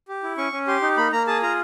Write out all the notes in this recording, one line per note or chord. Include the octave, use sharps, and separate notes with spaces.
G4
E4
C#4 C#6
C#4
G4 C6
D#4
A#3 B5
A#3 A#5
G#4 A5
F4 A#5